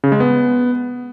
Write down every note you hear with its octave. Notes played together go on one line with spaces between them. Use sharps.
C#3
G#3
B3